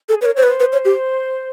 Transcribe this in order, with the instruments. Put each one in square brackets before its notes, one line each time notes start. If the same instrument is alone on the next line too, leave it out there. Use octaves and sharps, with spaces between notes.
[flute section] G#4 [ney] A4
[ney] B4 [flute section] C#5
[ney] A#4
[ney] C5 [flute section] C#5
[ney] B4
[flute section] C5
[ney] B4
C#5
G4